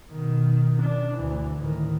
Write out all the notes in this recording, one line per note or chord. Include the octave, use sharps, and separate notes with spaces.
B2 D#3
D4
D2 E3
A2 D#3